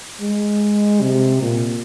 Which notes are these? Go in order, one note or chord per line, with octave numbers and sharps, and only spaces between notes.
G#3
C3
A#2